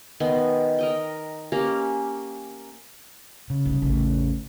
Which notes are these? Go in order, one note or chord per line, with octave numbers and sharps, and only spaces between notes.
D#3 B3 G#5 C6
A#4 D#5 G5
A#3 C#4 G4 A#5
C#3
C2
A1 E2